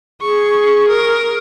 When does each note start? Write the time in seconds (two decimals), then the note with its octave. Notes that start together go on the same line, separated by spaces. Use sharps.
0.21 G#4 C#6
0.88 A#4